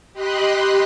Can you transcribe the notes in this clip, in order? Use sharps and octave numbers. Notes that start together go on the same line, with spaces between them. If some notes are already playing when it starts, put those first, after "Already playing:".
G4 D#5 B5 C6 F#6